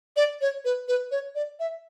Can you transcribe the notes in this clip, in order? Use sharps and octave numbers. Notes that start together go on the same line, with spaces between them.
D5
C#5
B4
B4
C#5
D5
E5